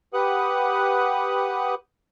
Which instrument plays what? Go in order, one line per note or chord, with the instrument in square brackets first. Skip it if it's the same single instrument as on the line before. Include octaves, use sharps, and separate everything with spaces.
[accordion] G4 B4 F#5 D#6 F#6